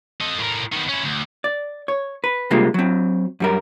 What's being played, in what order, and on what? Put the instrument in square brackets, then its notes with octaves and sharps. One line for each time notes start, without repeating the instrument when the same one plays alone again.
[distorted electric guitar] A4 D#5
A2 A#4
D#3 B3
C#4 E4
D2
[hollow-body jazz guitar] D5
C#5
B4
C3 G3 G#3 A#3 F4
F#3 C4
F#2 G3 A#4